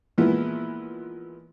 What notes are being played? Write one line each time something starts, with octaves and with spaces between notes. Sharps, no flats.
A#2 E3 F3 G#3 B3 E4